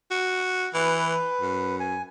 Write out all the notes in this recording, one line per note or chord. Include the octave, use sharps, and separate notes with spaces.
F#4
E3 B4
F#2
G#5